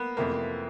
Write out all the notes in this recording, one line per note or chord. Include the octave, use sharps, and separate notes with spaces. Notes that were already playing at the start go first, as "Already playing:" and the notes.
Already playing: A#3 B3
F2 C3 E3 A3 A#3 C4